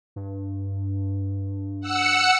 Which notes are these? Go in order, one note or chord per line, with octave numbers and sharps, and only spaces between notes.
G2
F#5 E6 C#7